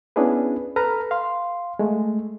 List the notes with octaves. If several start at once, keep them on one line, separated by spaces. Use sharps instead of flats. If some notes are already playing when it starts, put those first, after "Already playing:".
B3 C#4 D4 E4 G#4 B4
A4 B4 A#5 F6
F5 C6
G#3 A3